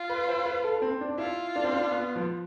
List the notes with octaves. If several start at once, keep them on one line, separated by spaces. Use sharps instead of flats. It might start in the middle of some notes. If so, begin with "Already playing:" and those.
Already playing: F4
B4
C5
B4
A4
C4
D4
E4 F4
D4
C4
D4
B3
F3